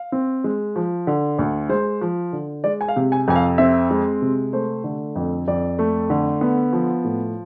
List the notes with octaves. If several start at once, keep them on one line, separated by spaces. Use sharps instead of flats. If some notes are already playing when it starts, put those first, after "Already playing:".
Already playing: F5
C4
G#3
F3
D3
D2
G#3 C5
F3
D3
G#3 D5
G#5
F5
C3
G#5
F2 G#5
F5
C4 E5
G#3
C3
A3 C5
D3
F2
F2 D5
A3
D3
B3
F3
A2